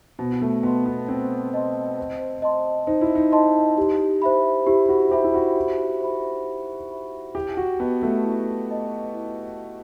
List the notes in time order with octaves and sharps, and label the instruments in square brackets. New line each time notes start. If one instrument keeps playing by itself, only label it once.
[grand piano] B2 [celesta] C5
[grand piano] A3
[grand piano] B3 [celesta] D#5 A5 C6
[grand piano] B3
[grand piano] C4 [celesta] C5
[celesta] D#5 A5 C6
C5
D#5 A5 C6
[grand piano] D#4 [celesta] C5
[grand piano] E4
D#4
[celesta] D#5 A5 C6
G4
C5 E5 B5
[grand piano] E4 [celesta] G4
[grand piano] F#4
[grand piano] G4 [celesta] C5 E5 B5
[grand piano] E4
F#4
[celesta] G4
C5 E5 B5
G4
C5 E5 B5
[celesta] E4 [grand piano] G4
[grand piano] F#4
[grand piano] B3 [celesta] B4 D#5 A5
[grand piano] A3
[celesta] E4
B4 D#5 A5
E4